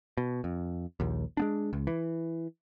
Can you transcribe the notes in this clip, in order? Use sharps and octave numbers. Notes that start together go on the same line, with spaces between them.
B2
F2
A#1 D#2
G#3 B3 D4
C#2
E3